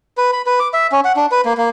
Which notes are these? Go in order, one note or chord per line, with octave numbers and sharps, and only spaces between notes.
B4
B5
B4
D6
E5
C#4
F#5
D4
B4
A#3
A#3